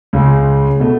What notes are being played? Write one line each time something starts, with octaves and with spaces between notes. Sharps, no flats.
C#2 C#3 G#3
B2 A3